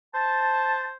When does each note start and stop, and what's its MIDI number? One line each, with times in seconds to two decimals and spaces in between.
0.14 0.95 72
0.14 0.85 81